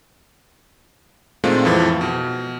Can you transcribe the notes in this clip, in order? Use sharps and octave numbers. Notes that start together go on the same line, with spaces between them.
A#2 D#3 G#3 A3 C4 F4
F2 A2 E3 F3
B2